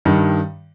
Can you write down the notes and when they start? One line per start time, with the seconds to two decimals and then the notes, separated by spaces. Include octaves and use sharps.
0.05 G2 D#3 G3